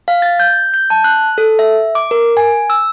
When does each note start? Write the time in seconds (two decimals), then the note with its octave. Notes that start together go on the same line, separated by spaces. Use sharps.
0.08 F5
0.22 A6
0.40 G6
0.74 G6
0.90 A5
1.04 F#6
1.38 A4
1.59 E5
1.95 D6
2.11 A#4
2.37 G#5
2.70 E6